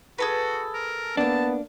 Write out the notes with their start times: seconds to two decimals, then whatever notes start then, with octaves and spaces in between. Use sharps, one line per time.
0.18 F#4 G#4 A4 B4
0.74 A#4
1.17 A#3 B3 D4 A5